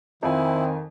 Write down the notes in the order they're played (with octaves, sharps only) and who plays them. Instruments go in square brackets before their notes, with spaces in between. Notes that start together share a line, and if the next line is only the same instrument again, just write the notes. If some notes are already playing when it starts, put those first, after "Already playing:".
[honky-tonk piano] F2 F4 G#5 [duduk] D#3 [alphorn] C4 [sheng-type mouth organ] E4